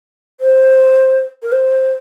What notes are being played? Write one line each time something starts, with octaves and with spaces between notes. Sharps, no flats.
C5
A#4
C5